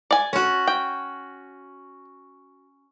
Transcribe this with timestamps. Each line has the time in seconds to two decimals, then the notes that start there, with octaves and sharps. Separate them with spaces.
0.11 D5 G#5
0.33 C#4 F#4
0.67 G5